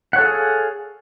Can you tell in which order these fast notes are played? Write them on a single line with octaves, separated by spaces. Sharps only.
F#5 C#5 A4 F5 G#4